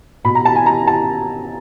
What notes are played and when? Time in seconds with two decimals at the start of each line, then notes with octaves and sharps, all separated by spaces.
0.24 B2 B5
0.35 A#5
0.45 A5
0.55 G#5
0.66 A#5
0.87 A5